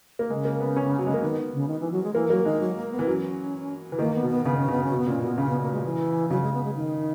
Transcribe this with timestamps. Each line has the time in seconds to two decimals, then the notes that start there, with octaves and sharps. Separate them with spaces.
0.19 A#3
0.30 C#3 G#3
0.45 A#3
0.60 B3
0.76 C#4
0.98 F#3
1.06 G#3
1.14 A#3
1.22 D#3 B3
1.54 C#3
1.68 D#3
1.81 E3
1.92 F#3
2.03 G#3
2.14 E3 A#3
2.30 F#3 A#3
2.45 D#3 G#3
2.60 F#3
2.76 A#3
2.91 B3
2.99 E3
3.07 F#3 C#4
3.92 E3
3.99 D#3 A#3
4.15 B3
4.23 B2
4.30 B3
4.45 C#3 B3
4.58 C#4
4.68 C#3 B3
4.84 C#4
4.91 B2
4.97 B3
5.07 A#2 C#4
5.22 B2 B3
5.38 C#3 C#4
5.49 B3
5.61 A#3
5.72 G#3
5.84 E3
6.30 C#3 F#3
6.42 G#3
6.54 B3
6.64 G#3
6.76 D#3